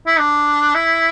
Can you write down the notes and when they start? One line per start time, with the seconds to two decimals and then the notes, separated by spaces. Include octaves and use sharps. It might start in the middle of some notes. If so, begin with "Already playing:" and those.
0.07 E4
0.19 D4
0.75 E4